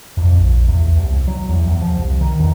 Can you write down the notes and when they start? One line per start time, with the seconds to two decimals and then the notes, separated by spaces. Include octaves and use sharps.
0.17 F2
0.36 A#1
0.68 E2
0.97 C2
1.27 F#3
1.49 E2
1.68 E2
1.82 F3
1.97 C2
2.21 D#3
2.39 E2